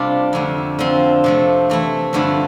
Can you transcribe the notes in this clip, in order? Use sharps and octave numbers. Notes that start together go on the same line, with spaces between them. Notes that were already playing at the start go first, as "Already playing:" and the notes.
Already playing: C3 G3 A3 D4 F4
F2 D3 A3
D3 F3 C4
C3 F3 A3
E3 A3 E4
G2 D3 F3 A3 C4